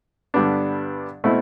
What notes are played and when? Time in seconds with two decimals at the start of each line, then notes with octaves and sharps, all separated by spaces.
0.34 G2 D3 G3 B3 D4
1.24 B2 A3 C4 E4